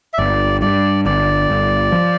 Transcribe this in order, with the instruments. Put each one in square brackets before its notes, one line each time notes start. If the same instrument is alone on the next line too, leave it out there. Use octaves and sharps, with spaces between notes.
[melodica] E5
[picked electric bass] G1 [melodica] D5
[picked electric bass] G2 [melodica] D5
[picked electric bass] G1 [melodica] D5
[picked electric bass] G1
F3